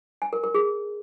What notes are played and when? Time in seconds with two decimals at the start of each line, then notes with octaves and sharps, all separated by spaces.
0.22 G#5
0.33 A#4
0.44 A#4
0.54 G#4